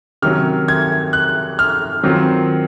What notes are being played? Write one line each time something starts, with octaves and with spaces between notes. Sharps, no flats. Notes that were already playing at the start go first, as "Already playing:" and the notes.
C3 D#3 F#3 C#4 F6
G#6
F#6
F6
D#3 F#3 C4 F4